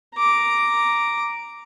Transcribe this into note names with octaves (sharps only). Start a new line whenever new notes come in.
A#5 D6